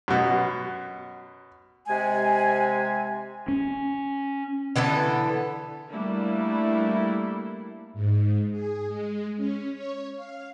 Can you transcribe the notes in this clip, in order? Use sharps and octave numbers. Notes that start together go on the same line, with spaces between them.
F#2 B2
C3 G#3 G#5
C#4
D3 E3 B3 A4
G3 A3 A#3 D4 E4
G#2
G#4
G#3
C#4
C#5
F5